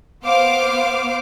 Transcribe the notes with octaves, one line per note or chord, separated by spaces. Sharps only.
B3 C5 F5 D6